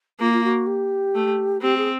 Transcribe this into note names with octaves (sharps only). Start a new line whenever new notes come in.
A#3 F4
F4
F#4
G4
A3
C4 G4
G#4